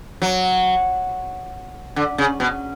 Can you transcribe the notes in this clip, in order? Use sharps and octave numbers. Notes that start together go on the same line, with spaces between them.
F#3
D3
C#3
B2